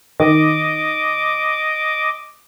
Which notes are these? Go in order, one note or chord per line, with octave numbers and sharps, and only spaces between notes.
D#3 D#5 D6